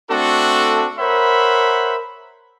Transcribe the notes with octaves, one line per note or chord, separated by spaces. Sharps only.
A3 C4 D4 F#4 A4
A#4 C5 C#5 E5 F#5 B5